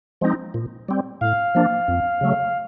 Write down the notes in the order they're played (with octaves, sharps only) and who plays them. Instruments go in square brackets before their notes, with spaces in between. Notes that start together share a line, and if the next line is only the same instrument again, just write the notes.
[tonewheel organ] F3 G#3 C4 D#4
A#2
G3 C4
[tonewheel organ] A2 [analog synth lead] F5
[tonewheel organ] F3 A#3 D4
F2
C#3 F#3 A3